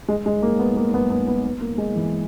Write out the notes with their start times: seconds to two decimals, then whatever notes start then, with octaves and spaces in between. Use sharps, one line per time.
0.08 G#3
0.26 G#3
0.42 A#3
0.59 B3
0.77 A#3
0.94 B3
1.10 B3
1.27 B3
1.45 B3
1.61 A#3
1.78 G#3
1.95 E3